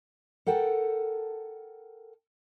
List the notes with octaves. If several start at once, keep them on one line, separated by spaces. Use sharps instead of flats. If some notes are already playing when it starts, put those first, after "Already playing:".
A4 A#4 F#5 G5 A5